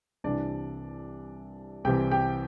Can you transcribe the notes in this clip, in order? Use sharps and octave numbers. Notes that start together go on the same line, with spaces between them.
C2 C3 E3 D4 D5
C2 C3 E3 G4 G5
G4 G5